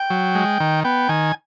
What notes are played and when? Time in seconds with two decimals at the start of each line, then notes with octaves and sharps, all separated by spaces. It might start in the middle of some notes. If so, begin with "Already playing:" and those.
Already playing: G5
0.10 F#3
0.35 G#3
0.60 D#3
0.84 B3 G5
1.09 D#3 G#5